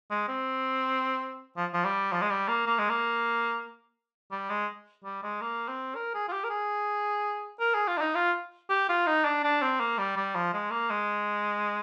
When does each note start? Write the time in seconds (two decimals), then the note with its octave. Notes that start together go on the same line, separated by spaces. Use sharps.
0.11 G#3
0.29 C4
1.57 F3
1.74 F3
1.85 G3
2.12 F3
2.22 G#3
2.30 G3
2.48 A#3
2.67 A#3
2.79 G#3
2.89 A#3
4.31 G3
4.50 G#3
5.04 G3
5.23 G#3
5.41 A#3
5.68 C4
5.95 A#4
6.14 G#4
6.28 F4
6.33 G4
6.44 A#4
6.50 G#4
7.60 A#4
7.74 G#4
7.88 F4
7.97 D4
8.01 D#4
8.15 F4
8.70 G4
8.89 F4
9.07 D#4
9.25 D4
9.44 D4
9.62 C4
9.80 A#3
9.98 G3
10.17 G3
10.35 F3
10.53 G#3
10.71 A#3
10.90 G#3